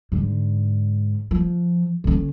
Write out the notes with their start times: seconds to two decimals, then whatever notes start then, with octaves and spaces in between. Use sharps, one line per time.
0.12 G#2 D3
1.31 F3
2.04 D3 C#4